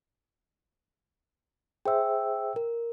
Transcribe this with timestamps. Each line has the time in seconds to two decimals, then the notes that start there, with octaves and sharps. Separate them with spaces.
1.85 G#4 C5 E5 G5 E6
2.56 A#4